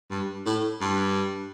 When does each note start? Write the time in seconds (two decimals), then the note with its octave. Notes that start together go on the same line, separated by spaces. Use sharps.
0.10 G2
0.46 A2
0.81 G2